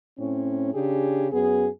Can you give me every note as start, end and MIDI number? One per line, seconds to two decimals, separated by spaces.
0.18 0.72 45
0.18 0.72 60
0.18 0.72 61
0.73 1.26 49
0.73 1.26 62
0.73 1.26 67
0.73 1.26 68
1.32 1.67 42
1.32 1.67 59
1.32 1.67 68